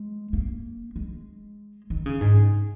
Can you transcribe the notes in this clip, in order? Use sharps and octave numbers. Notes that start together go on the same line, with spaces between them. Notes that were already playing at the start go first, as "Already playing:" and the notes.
Already playing: G#3
A#3
G#3
D#3
C#3
G#2